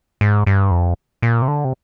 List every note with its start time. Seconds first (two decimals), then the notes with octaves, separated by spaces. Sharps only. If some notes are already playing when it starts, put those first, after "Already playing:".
0.21 G#2
0.47 G2
0.71 F2
1.22 A#2
1.42 C3
1.48 D3
1.65 C3